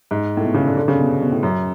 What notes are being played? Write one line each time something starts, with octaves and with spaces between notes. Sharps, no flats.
G#2
A2
B2
C#3
D3
D3
C#3
B2
B2
A2
F#2